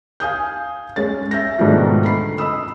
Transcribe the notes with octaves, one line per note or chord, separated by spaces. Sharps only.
F5 G#5 D#6 G6
G#3 C#4 A6
E5 G6 A#6
G#2 B2 D#3 A3 D4 F4
D3 B5 C7
D#5 B5 D#6 E6